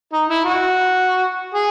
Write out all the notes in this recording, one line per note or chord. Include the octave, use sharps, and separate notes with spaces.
D#4
E4
F#4
G#4